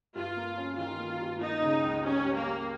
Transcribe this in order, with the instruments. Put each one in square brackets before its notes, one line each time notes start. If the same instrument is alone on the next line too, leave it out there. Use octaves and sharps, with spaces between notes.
[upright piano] G2 [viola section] F4
[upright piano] A#3
C#4
[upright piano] D#3 [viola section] F4
[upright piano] A#3
G2
[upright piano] A#3 [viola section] D#4
[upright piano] C#3
C#2
[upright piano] G3 [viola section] C#4
[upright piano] G3
[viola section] A#3
[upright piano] G3